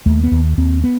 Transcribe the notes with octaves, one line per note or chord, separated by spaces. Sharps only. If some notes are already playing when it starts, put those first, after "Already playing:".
D#2 A3
B3
D#2
D#2 C4
B3